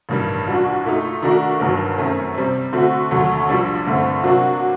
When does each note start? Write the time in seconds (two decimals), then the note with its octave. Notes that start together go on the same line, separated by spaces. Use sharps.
0.09 A1 G2 D#3 G3
0.47 C2 A#2 G3 D4 F#4
0.85 A#2 A3 D#4
1.22 D#3 A3 D4 F#4 A#4
1.60 G1 G2 D#3 F#3
1.98 F#2 D#3 A3 C4
2.35 C3 G3 C4
2.73 D3 A3 C4 F#4
3.11 D#2 D3 F#3 A3
3.49 A#1 A#2 G3 D4
3.86 G2 D3 A3 C4
4.24 C3 F#3 A#3 D4 F#4